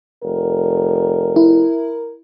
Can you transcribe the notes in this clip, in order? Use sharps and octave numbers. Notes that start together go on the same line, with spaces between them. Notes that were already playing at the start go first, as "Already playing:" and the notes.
F1 A#4
E4